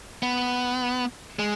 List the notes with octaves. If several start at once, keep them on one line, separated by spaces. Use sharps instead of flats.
B3
G#3